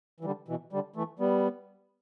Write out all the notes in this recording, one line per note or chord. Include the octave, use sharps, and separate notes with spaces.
E3
D3 G3
B2 E3
D3 G3
E3 A3
G3 B3